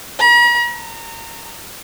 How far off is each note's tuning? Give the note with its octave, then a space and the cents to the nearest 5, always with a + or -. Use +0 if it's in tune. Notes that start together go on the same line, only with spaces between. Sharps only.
A#5 +45
A#5 -25